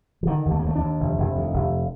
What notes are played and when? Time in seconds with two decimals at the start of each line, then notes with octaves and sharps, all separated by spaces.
0.23 F3
0.27 D3 D#3
0.46 D#2
0.51 A3
0.59 A#3
0.64 D#2 A3
0.75 D4
0.81 D#2
1.00 F1
1.18 F1
1.35 D#2
1.53 F1